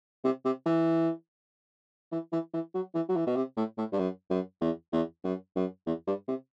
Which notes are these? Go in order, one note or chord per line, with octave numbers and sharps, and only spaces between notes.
C3
C3
E3
E3
E3
E3
F#3
E3
F#3
E3
B2
C3
A2
A2
G2
F#2
F#2
E2
E2
F#2
F#2
E2
G2
C3